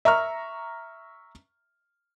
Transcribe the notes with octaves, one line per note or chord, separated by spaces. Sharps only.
E5 A#5 C#6 F6